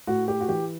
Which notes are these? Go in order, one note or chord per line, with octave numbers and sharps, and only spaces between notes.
A2 F#4
G4
F#4
E3 G4